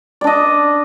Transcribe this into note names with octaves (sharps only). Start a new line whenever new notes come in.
D4 D5 D#5